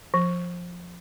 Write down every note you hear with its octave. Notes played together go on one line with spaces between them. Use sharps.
F3